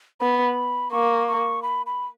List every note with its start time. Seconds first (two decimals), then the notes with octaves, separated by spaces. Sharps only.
0.21 B3 B5
0.91 A#3 C#6
1.28 C#6
1.63 B5
1.86 B5